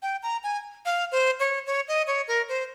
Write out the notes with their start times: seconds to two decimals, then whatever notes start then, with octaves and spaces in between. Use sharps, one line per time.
0.02 G5
0.23 A#5
0.44 G#5
0.85 F5
1.12 C5
1.40 C#5
1.67 C#5
1.88 D#5
2.07 C#5
2.28 A#4
2.49 C5